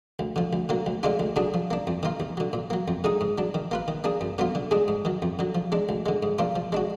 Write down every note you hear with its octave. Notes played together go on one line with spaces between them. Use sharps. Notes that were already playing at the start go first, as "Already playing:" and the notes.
D2
D3 F3
D2
D3 F#3 A#3
D2
D3 G#3 D4 F4
D2
D3 F#3 D4 G#4
F3
A#3 D4
F2
D#3 A#3 F4
D#2
D3 F#3
A#2
F#3 A#3
F2
D3 G#3 D#4 G#4
G#2
F#3 D4
D#3
A#3 F4 B4
D#3
A#3 D4 G#4
F#2
D3 F#3 B3 F4
D3
G#3 D4 G#4
G#2
D#3 F#3
F2
D3 F#3
F3
G#3 D4
D2
D3 G#3
G#2
F3 A#3 D4 F4
F3
G#3 D4 F#4